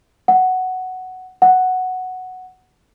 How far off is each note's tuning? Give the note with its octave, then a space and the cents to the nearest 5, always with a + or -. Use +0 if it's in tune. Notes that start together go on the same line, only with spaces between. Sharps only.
F#5 +5
F#5 +0